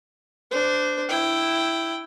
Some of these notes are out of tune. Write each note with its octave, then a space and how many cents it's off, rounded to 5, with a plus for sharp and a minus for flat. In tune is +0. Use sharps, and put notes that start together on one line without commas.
D4 +0 C5 -25
E4 +0 G5 -5